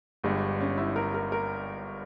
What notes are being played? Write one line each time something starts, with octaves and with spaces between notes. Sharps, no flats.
G1 G2 G3 G#3
C#4
E4
A#4
A#4
A#4